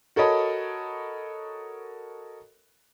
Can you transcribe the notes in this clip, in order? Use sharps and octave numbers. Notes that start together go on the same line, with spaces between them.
F#4 A4 A#4 C#5 D#5 B5